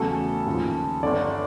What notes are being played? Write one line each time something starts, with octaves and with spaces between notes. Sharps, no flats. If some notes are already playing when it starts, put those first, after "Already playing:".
Already playing: E2 C#3 F#3 A3 A4
D#2 C#3 F3
G1 G2 D3 D5